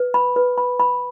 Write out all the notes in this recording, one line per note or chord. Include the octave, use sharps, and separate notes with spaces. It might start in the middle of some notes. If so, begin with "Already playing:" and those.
Already playing: B4
B5
B4
B5
B5